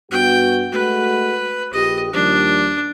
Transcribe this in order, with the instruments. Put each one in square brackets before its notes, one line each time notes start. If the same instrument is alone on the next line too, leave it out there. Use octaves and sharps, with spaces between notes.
[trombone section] G2 B3 F#4 [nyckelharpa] G5
[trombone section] G#3 A3 F#4 [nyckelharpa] B4
[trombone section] A#1 G4 [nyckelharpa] D#5
[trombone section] D#2 F3 G3 [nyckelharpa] D4